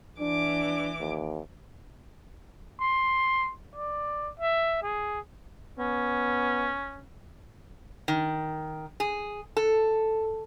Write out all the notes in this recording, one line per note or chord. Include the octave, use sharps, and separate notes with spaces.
E3 D4 D6
D#2
C6
D5
E5
G#4
B3 C#4
D#3
G#4
A4